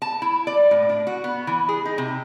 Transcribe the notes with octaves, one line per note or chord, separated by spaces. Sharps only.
A5
E4
D5
A2
D4
F#4
B3
E3
G#4
D#4
C3